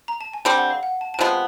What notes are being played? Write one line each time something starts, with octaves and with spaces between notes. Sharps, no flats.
A#5
A5
G#5
D3 G3 C4 G5
F#5
F5
F#5
A5
A5
C3 F3 G#3 B3 G#5